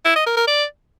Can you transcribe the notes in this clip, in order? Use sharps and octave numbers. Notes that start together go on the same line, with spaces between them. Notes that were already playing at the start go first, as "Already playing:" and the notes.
E4
D#5
A#4
A#4
D5